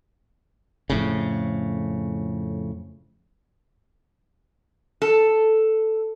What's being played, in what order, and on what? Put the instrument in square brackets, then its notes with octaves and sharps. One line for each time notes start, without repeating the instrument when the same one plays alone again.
[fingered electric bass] F2 A2 C#3
[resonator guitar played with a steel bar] A4